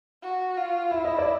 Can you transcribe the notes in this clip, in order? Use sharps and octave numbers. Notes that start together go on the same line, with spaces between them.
F#4
F4
E4 E5
D#5
D5 E5